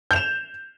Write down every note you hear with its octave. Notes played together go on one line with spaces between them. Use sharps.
G6 E7 F7